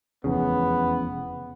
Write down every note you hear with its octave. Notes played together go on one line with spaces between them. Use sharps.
F1 E2 C#3 B3